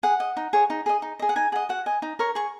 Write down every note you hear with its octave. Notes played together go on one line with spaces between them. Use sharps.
G#4 F#5
D#5
D#4
G#4 C#5
D#4
G#4 D#5
D#4
G#4 D#5
F#5
D#4 G#5
G#4 D#5 F#5
F#4 F#5
D#5 G#5
D#4
A#4 C#5 C#6
G#4 C#6